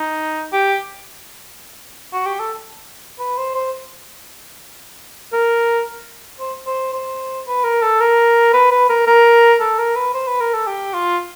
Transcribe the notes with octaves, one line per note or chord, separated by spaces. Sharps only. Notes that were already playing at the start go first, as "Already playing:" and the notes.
Already playing: D#4
G4
F#4
G4
A4
B4
C5
C5
A#4
C5
C5
C5
B4
A#4
A4
A#4
B4
B4
A#4
A#4
A4
A#4
B4
C5
B4
A#4
A4
G4
F4